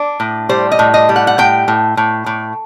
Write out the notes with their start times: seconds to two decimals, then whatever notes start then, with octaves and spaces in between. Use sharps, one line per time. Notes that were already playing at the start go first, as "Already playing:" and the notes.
Already playing: D4
0.20 A2
0.49 G3 C5
0.72 D#5
0.79 A2
0.94 D#5
1.09 G3
1.16 F#5
1.27 F#5
1.38 A2 G5
1.68 A2
1.97 A2
2.26 A2